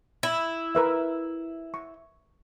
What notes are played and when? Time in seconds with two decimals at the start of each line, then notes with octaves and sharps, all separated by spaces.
0.23 E4
0.75 A#4 B4 E5
1.74 C#6